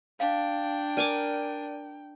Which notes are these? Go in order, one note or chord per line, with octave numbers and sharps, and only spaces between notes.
D4 F5 G5
A#4 D5 G#5 D6 D#7